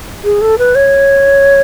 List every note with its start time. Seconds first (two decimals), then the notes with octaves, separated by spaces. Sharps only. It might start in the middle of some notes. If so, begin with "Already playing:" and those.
0.24 G#4
0.41 A4
0.58 B4
0.75 C#5